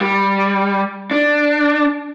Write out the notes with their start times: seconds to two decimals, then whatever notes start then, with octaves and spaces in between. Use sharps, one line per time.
0.01 G3
1.11 D4